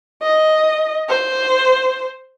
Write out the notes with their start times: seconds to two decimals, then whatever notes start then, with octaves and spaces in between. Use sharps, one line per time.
0.22 D#5
1.09 C5